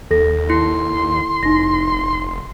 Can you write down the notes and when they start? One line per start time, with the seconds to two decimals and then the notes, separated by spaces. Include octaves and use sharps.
0.11 D#2 A4 A#6
0.50 E4 C6
1.43 F1 D#4 A#6